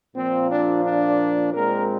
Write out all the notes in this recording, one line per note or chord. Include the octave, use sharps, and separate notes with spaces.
A#2 F3 A#3 C4
D4
D4
A#2 G#3 C4 A#4